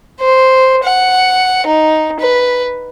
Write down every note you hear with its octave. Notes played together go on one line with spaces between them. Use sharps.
C5
F#5
D#4
B4